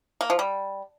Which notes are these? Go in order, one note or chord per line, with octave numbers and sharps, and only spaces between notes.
A#3
F3
G3